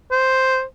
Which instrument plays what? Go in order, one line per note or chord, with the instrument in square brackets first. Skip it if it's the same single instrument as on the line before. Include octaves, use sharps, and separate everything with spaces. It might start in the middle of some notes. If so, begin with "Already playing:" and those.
[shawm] C5